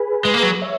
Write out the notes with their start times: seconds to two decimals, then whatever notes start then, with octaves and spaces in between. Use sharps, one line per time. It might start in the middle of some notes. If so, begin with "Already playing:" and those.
Already playing: G#4 B4
0.25 G#3
0.34 A#3
0.43 F#3
0.62 C#5 E5